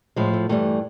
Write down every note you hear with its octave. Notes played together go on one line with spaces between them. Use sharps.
A2 F3 G#3
A3
G2 E3 G3 A3